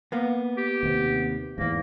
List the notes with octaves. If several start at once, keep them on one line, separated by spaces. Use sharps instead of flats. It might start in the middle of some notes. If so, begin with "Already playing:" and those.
A#3 B3
G4
D#2 C3
E2 G#2 A#3